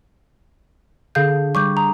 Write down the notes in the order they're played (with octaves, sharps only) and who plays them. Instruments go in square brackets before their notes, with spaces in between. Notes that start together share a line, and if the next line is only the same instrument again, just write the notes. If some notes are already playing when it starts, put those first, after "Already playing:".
[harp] D3 [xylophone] G#4 F5 G6
[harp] G3 [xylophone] C#6 D6 G6
[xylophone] A#5 [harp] D#6